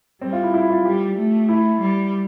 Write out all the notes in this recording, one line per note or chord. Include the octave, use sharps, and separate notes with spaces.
G3 C4
F4
E4
E4
F4
G3 G4
A3
E4
G3